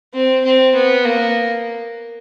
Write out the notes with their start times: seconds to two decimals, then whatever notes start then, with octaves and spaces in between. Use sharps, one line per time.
0.14 C4
0.44 C4
0.74 B3
1.05 A#3